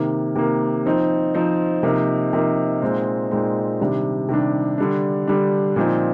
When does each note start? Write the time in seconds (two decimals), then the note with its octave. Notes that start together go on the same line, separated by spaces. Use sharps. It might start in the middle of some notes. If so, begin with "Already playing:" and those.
Already playing: C3 D#3 A#3
0.35 C3 D#3 A#3
0.86 F3 C4 D#4
1.34 F3 C4 D#4
1.83 C3 F3 A#3 D#4
2.33 C3 F3 A#3 D#4
2.82 A#2 G#3 C4 D#4
3.31 A#2 G#3 C4 D#4
3.80 C3 D#3 G3 D4
4.29 C3 D#3 G3 D4
4.78 D3 G3 D4
5.27 D3 G3 D4
5.76 A#2 F3 C4 D#4